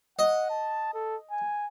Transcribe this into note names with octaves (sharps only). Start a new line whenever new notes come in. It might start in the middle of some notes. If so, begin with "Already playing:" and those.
D#5 F#5
A5
A4
G#5